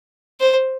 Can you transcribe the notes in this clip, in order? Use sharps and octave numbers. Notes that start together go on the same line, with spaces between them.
C5